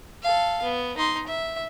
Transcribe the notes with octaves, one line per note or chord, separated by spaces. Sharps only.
A4 F5
B3
D#4 C6
E5